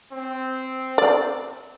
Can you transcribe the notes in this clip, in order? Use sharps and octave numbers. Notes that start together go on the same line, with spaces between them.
C4
D5